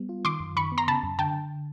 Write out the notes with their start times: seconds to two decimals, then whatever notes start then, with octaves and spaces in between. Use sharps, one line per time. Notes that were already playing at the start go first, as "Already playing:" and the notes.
Already playing: G3 B3
0.09 F4
0.25 D#3 C6 D6
0.40 F#2
0.56 D#3 B5 C#6
0.72 B3
0.78 A#5 C6
0.88 C#3 A5 B5
1.03 F#2
1.19 D3 G5 A5